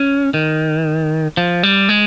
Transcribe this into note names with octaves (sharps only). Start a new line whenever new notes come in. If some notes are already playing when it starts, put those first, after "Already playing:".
Already playing: C#4
D#3
F3
G3
G#3